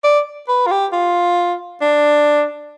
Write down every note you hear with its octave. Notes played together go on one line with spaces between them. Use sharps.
D5
B4
F4
G4
F4
D4